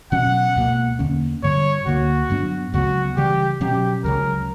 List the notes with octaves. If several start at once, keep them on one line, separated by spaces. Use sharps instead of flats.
B2 F#3 C#4 F#5
C#2 B2 A#3
E2 D3 A#3 C#4
G2 D3 G3 C#5
D2 D3 G3 A#3 F#4
G2 F#3 B3 D4
C#2 C#3 F#3 B3 F#4
C#3 E3 G3 G4
B2 F#3 C#4 G4
C#2 C#3 F#3 A#4